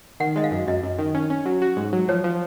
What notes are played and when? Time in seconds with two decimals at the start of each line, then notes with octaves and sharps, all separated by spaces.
0.20 D#3 F#5
0.36 G#3 D#5
0.44 F5
0.51 F#2
0.67 F#2 D#5
0.83 F#2
0.99 D#3
1.15 C#4
1.30 C#4
1.46 F#3
1.62 F#4
1.77 G#2
1.93 F#3
2.08 F3 C#5
2.24 F3